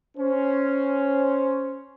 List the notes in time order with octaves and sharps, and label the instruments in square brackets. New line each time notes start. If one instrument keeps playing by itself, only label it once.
[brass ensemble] C#4 C5